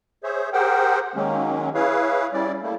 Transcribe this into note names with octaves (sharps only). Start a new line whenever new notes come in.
G#4 C5 C#5 E5
G4 G#4 A#4 C5 F#5 G5
D#3 F#3 G#3 A#3 C#4
E4 G#4 B4 C#5 F5
G3 C#4 E4 D5
G3 A3 A#3 E4